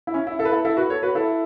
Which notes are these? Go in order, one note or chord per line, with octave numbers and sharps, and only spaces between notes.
E4
C#4
E4
E4 A4
B4
E4 A4
E4 A4
F#4 B4
A4 C#5
F#4 B4
E4 A4